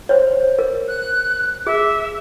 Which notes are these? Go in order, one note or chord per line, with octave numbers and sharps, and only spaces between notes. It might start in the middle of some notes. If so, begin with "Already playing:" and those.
C5 C#5
A#4
F#6
G#4 E5